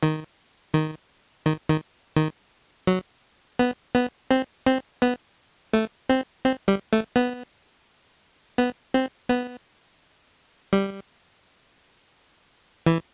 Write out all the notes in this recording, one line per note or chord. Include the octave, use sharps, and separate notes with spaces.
D#3
D#3
D#3
D#3
D#3
F#3
B3
B3
C4
C4
B3
A3
C4
C4
G3
A3
B3
B3
C4
B3
G3
E3